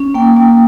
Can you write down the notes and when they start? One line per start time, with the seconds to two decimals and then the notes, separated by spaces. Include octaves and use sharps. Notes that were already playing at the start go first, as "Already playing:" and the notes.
Already playing: C#4
0.14 A#3 G5
0.36 A#3 G5